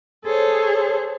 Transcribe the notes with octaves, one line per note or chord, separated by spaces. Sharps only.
G#4 A4 C5 C#5